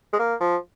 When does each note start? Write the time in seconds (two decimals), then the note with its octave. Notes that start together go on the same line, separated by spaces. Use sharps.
0.13 G#3
0.19 A#3
0.41 F3